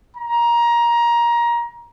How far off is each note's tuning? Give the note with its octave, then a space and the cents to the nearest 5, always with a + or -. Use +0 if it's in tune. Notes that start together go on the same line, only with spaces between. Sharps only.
A#5 +20